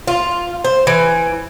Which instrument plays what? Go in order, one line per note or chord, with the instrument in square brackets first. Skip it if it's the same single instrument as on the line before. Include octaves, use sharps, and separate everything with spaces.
[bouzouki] F4
C5
E3